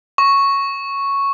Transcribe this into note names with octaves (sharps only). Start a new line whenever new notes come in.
C#6